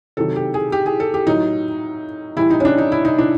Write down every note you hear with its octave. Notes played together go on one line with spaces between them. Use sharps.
C3 D#3 F#3 A4
G4
G#4
G4
G#4
A4
G4
A2 F#3 D#4
A2 E3 G3 E4
D#4
C#4
D4
D#4
E4
D#4
D4